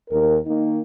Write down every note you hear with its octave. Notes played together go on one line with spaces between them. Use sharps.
D#2 A#4
D#3 A#3 D#4